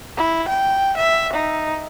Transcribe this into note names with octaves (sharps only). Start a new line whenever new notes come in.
E4
G5
E5
D#4